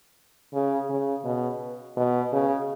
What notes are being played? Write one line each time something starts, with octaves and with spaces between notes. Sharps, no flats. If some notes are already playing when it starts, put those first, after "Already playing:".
C#3
C#3
B2
B2
C#3